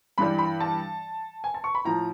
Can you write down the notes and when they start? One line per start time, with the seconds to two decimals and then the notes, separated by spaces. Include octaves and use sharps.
0.18 G2 E3 G3 B5
0.39 B5
0.60 A5
1.44 G#5
1.54 A5
1.64 C#6
1.75 B5
1.85 A2 F3 A#5